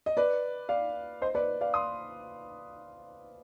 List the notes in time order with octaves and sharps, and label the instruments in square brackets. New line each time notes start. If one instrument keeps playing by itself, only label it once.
[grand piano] D#5
B4 D5
D5 F5
C5 D#5
B4 D5
D5 F5
C6 D#6